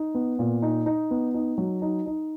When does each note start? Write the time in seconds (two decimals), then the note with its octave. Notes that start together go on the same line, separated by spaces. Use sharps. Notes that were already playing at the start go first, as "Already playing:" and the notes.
Already playing: D#4
0.15 B3
0.39 A#2
0.62 D#4
0.86 D#4
1.11 B3
1.34 D#4
1.58 F#3
1.82 D#4
2.06 D#4